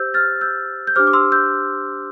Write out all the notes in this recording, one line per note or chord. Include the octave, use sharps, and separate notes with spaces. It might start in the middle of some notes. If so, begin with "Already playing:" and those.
Already playing: G4 C5 E6 G6
F6 A6
E6 G6
G6
D4 G4 C5 D6 F6
D6
C6 E6
E6 G6